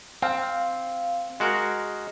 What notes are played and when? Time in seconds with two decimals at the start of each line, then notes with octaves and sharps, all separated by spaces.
0.22 C4 F5
1.40 G#3 F#4 A#4